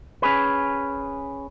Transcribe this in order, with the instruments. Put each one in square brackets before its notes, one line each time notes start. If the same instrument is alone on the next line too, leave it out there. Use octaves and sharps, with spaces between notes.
[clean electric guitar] C#4 G#4 B4